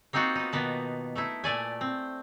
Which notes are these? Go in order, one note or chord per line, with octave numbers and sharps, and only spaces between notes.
A#3 C4 D#4 F4 F#4
B3 D#4
B2 D#3 A#3 B3 A5
A3 D#4 E4
A#2 A3 D5 G#5
C4